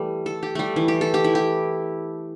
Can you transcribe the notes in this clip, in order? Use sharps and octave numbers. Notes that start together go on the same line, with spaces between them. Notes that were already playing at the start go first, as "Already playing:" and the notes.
Already playing: E3 G3 A3
A4
G4
G3 A3
E3
G4
A4
G4
E4
G4